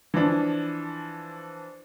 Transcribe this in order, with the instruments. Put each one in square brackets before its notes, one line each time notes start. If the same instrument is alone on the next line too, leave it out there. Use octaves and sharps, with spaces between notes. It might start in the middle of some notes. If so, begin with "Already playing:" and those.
[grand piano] E3 F3 D4